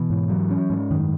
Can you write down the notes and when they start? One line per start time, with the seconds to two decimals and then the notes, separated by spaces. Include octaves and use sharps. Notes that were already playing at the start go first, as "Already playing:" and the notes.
Already playing: B2 E3
0.10 G#2
0.29 F#3
0.51 C#4
0.70 G#2
0.90 F#2 D#3